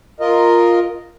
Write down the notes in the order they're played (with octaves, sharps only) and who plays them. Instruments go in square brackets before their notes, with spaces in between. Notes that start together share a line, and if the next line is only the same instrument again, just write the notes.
[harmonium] F4 A#4 D#5